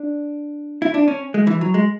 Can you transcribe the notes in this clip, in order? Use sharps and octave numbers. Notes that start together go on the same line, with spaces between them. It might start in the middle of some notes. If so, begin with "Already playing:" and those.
Already playing: D4
E4
D4
C#4
G#3
E3
F#3
G#3